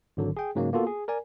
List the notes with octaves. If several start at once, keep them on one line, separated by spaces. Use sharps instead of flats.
G#1 D3 F#3
G#4 G5
G#2 C#3 F#3 G#3 A#3
A#3 B3 F4 F#4 A4
G#4
A#4 D5 G#5